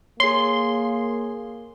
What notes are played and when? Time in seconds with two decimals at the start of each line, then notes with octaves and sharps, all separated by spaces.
0.20 A#3 G#4 C#5 C6